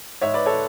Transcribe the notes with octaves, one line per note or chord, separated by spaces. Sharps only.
G#2 G#3 C#5 E5
B4 D5
A4 C#5